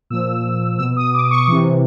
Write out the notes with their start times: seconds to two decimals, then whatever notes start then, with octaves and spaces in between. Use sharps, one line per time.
0.10 A#2 F3 E6
0.79 B2 E6
0.97 D#6
1.14 D6
1.31 C#6
1.48 C3 E3